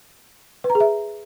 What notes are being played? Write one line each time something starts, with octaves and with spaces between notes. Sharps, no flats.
B4
A#5
G#4
E5